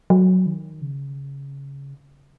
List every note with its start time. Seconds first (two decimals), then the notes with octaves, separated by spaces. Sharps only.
0.10 F#3
0.46 D#3
0.81 C#3